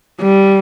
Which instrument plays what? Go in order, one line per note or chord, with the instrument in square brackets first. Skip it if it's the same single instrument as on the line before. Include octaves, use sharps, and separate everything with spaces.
[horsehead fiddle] G3